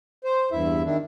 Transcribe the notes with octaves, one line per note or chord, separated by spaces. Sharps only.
C5
E2 G2 E4 E5
D#3 D4 E4